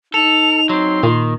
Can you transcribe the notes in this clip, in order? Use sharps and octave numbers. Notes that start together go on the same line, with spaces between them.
D#4 A4 F7
F#3 C4 C6
A#2 D#3